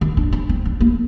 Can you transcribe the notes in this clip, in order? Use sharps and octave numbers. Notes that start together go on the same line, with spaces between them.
D#3
D4
D4
C4
D4
A#3